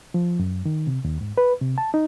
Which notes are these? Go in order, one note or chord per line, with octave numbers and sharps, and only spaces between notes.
F3
F#2
D#3
C3
D#2
G#2
B4
C3
A5
D#4